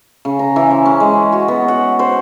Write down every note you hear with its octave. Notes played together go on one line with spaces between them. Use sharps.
C#3
A#5
E3
C5
C#4
G#3
F#4
B3
F#5
C5